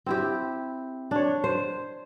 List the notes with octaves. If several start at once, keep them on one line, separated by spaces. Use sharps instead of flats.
C4 E4 G4
D4 C#5
C5